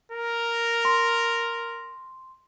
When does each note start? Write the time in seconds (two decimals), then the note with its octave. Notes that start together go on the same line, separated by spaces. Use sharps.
0.12 A#4
0.85 C6